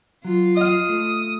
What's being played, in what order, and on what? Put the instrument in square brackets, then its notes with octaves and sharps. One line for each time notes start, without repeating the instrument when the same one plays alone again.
[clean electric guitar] F#3 [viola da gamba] F4
[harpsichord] D#5 F5 [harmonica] D#6
[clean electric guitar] A3